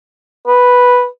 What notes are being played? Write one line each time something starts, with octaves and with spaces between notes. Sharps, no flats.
B4